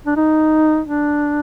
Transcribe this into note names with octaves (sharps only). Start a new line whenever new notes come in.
D4
D#4
D4